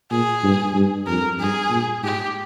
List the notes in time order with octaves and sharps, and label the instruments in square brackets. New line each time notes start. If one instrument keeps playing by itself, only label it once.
[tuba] A#2 [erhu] G#4
[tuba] G2
G2
[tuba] F2 [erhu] A#4
[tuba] G2 [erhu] G#4
[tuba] A#2
[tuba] G#2 [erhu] G4